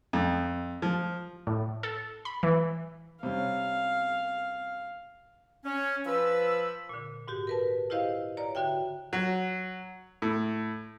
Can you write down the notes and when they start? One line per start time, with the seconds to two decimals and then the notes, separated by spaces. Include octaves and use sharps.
0.13 F2
0.82 F3
1.47 A2
1.83 A4
2.25 B5
2.43 E3
3.23 C3 G3 C#4 F5
5.65 C#4
6.05 F3 B4 E6
6.89 A#2 D3
7.28 G#2 F#4 G4
7.47 A#4 B4 A5
7.90 E4 F4 G4 C5 D#5 F5
8.37 C#5 D5 A#5
8.55 D3 F#4 E5 G5
9.13 F#3
10.22 A2